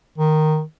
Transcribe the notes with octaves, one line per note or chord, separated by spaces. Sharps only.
D#3